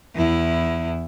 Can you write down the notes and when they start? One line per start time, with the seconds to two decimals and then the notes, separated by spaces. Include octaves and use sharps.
0.15 E2 E4